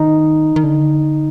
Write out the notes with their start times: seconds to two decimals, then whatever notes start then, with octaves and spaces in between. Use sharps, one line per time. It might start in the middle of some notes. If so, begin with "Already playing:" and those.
Already playing: D#3 D#4
0.56 D#3
0.64 D3